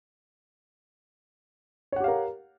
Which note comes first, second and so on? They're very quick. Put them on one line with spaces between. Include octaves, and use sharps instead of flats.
C#5 F#5 G4 F5 A#4